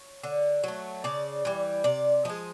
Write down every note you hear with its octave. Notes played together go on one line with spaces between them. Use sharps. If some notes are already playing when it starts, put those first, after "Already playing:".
Already playing: C#5
D3
F#3 A3
C#3 D5
E3 G3
C3 D5
F3 G#3 D#5